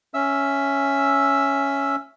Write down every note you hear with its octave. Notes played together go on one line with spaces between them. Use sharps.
C#4 E5 E6